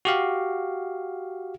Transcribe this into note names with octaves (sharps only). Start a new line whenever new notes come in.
F#4 G4 F5